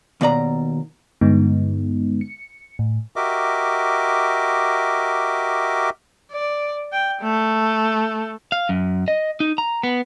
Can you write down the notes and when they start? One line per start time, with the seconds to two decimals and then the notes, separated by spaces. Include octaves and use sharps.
0.21 D#2 B2 D5 A#5
1.21 G2 D3 G#3 B3 D#4
2.21 C#7
2.79 A2
3.16 F#4 G4 A#4 D#5 E5 D6
6.31 D5
6.92 G5
7.22 A3
8.52 F5
8.69 F#2
9.08 D#5
9.40 D#4
9.58 A#5
9.83 B3